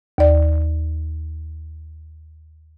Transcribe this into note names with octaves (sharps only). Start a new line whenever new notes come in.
D#2 D5